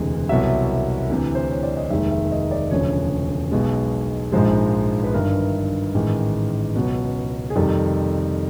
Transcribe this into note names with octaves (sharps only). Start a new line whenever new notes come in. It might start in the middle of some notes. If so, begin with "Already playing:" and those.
Already playing: E1 D2 C3 E3 G#3
C2 B2 F#3 E5
D2 C3 E3
C5
C#5
D5
D#5
F1 D#2 D#3 G#3 E5
E5
D#5
D5
E1 D2 C#3 F3 C#5
B1 B2 G#3
A#1 G#2 F3 G#3 C5
B4
G1 G2 D#3 A#4
A1 G#2 D#3 G#3
C#2 B2 F#3
G#4
F2 C3 D#3 G3 A4